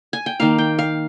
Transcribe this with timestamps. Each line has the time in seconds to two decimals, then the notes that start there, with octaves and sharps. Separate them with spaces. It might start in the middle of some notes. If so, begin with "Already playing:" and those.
0.13 G#5
0.26 G5
0.40 D#3 A#3 F5
0.58 G5
0.79 F5